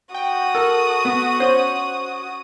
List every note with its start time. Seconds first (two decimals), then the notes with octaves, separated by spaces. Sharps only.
0.15 F#4 G5 D#6
0.55 A4 A#4
1.05 B3
1.40 C#4 C5